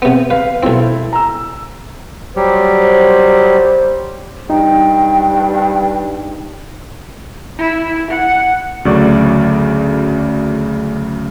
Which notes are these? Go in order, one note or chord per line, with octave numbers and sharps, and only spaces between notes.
C3 B3
B4 F5
B1 C4 E4 A4
A#5 E6
F#3 G3 G4 C5
G2 D#4 G5
E4
F#5
D2 C#3 F#3 A3 D5 C#6